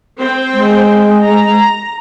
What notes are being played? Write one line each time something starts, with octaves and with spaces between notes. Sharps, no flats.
C4 C5 G5
G#3
A#5